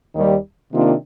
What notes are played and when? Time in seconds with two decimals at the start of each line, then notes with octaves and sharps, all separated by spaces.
0.15 D#2 D#3 G3
0.72 C3 D#3 A#3 D4 F4